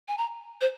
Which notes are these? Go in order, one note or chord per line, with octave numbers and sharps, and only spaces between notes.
G#5
A#5
C5